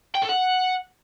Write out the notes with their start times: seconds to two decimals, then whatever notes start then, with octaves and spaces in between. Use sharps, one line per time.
0.15 G5
0.22 A4
0.29 F#5